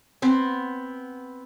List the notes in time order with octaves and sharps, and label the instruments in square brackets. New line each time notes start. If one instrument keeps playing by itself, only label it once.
[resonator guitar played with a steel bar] B3 C4